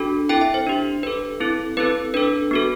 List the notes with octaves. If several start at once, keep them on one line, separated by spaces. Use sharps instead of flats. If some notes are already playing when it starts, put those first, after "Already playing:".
Already playing: D4 F#4 A4
C4 E4 A4 G5
E5
C5
D4 G4
D4 A4 B4
C4 E4 A4
C4 E4 A4 B4
D4 A4 B4
B3 F#4 A4